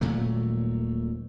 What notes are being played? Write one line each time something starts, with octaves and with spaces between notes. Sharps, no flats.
D#1 A#2 F#3 A3